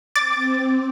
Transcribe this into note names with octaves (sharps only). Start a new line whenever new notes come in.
C4 D6 A6